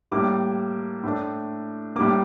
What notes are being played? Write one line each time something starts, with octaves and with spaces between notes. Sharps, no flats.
A2 G3 A#3 D6
A2 A3 D4
A2 G3 A#3 D6